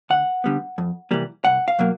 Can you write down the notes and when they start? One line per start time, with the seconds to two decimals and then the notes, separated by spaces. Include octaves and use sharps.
0.10 D2 F#5
0.44 D3 G3 B3
0.78 F2
1.11 C3 E3 G3 A#3
1.45 C2 F#5
1.68 F5
1.79 B2 F#3 A#3